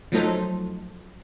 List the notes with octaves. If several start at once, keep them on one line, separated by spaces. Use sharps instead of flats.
F3 F#3 A3 D#4 A4 C5